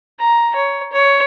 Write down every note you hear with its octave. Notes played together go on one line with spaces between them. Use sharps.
A#5
C#5
C#5